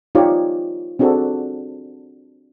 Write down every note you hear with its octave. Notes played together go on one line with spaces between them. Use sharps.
D#4 F4 G4 C#5 D5
C4 D4 F#4 G#4 A4